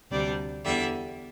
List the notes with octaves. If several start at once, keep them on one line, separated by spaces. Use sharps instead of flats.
D2 C3 G3 D4 D5
E2 D3 G3 E5